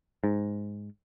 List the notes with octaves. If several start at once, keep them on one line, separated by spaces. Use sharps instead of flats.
G#2